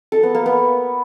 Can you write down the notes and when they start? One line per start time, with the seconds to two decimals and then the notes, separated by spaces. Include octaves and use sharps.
0.12 A4
0.23 B3
0.35 A#3
0.46 B3